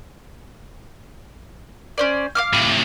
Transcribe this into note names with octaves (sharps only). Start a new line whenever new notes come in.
C#4 C5 D5
F5 D6 F6
A2 C3